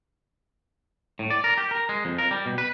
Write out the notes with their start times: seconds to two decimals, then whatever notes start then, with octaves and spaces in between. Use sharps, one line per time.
1.19 A2
1.30 D5
1.44 A#4
1.58 G4
1.71 A#4
1.89 G#3
2.05 F2
2.18 A#4
2.31 G3
2.46 B2
2.58 B4